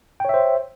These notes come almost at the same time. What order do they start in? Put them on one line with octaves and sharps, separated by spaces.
G5 C#5 E5 C5